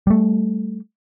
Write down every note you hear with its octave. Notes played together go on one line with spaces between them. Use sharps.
G3 A3